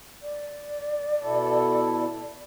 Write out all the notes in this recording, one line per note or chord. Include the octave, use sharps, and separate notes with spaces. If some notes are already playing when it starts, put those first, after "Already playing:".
D5
B2 E4 A4